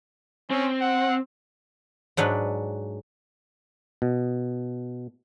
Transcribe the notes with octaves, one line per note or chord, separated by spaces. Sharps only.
C4 C#4
F#5
G#2 F#3 D4 B4
B2